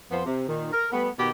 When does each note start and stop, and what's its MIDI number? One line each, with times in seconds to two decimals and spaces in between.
0.11 0.22 41
0.11 0.22 53
0.11 0.22 59
0.11 0.22 72
0.26 0.45 48
0.47 0.71 46
0.47 0.71 51
0.73 0.88 70
0.92 1.08 55
0.92 1.08 57
0.92 1.08 59
1.19 1.30 47
1.19 1.30 51
1.19 1.30 67